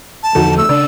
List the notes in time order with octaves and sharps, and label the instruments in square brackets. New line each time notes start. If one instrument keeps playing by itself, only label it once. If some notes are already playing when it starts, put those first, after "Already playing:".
[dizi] A5
[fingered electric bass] E2 D3 F3 [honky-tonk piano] D#4 F#4 A4
[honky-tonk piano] A3 [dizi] E6
[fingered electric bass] C#3 D4 [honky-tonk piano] D5